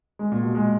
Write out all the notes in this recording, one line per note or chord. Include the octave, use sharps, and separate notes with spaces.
G#3
A#2
B2
G#3